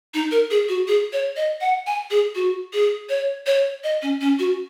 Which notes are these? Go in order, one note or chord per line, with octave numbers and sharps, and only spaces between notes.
D#4
A#4
G#4
F#4
G#4
C#5
D#5
F#5
G#5
G#4
F#4
G#4
C#5
C#5
D#5
C#4
C#4
F#4